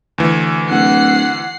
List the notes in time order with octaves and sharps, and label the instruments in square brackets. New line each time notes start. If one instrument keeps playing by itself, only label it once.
[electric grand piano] D2 E3
[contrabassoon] D1 [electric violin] F#5 C7